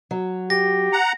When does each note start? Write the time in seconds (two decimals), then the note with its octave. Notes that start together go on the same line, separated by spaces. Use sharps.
0.11 F#3
0.50 G4 A#6
0.93 F#5 A#5